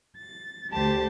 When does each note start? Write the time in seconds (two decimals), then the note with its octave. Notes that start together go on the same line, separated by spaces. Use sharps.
0.17 A6
0.72 D2 G4 C5 A5